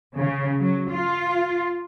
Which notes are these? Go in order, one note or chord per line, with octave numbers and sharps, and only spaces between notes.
C#3
F#3
F4